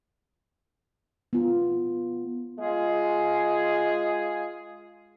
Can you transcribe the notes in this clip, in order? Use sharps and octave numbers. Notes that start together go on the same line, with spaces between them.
B3 F4
G#3 F4 G#4